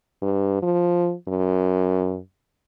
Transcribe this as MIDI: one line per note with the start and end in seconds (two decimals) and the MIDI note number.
0.22 0.60 43
0.63 1.14 53
1.28 2.19 42